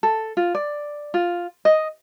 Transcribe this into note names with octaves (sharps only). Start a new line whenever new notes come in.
A4
F4
D5
F4
D#5